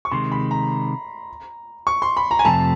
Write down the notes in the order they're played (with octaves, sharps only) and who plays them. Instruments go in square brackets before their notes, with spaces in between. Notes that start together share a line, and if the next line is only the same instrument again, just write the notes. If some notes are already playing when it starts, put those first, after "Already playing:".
[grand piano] C#6
[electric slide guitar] C3 D#3 G#3 [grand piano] C6
[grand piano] B5
A#5
C#6
C6
B5
A#5
G#5
[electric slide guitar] F2 C3 F3 A3 [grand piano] A5